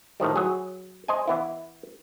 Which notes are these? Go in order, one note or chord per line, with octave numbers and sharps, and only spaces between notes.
A2 D#3 F3 G3
F#3 G#4
C5 D#5 G#5
E3 B3 E4